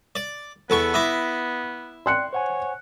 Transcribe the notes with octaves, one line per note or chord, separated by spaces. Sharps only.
D5
E2 B3 A4 C#6
E4 D6 D#6 A#6
D5 G5 C6 F#6 C#7
C5 C#5 F#5 G#5